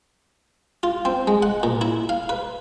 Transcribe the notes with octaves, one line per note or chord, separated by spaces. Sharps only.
F4
C4
G#3
F#5
A#2
E4
F5
B4